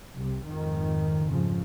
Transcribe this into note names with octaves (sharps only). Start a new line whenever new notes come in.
C2 C3
F2 G#2 D#3
F2 G#2 C#3 F3